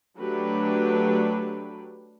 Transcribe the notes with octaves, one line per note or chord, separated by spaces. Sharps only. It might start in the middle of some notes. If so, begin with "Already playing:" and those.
F#3 A3 D4 G4 B4